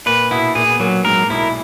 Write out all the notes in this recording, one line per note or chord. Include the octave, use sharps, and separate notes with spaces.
A#2 A#3 B4
B2 B3 E4
A#2 A#3 G#4
B3
A#2 F#3 A#3
G#2 G#3 A#4
B1 B2 E4